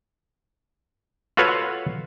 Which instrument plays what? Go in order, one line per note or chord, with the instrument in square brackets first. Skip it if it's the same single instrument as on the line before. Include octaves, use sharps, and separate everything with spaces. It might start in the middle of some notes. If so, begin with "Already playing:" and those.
[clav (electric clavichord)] F4 F#4 A4 B4 C#5 F5